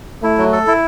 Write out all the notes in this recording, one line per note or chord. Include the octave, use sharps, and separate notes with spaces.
A3 E4
F#3
A4
E4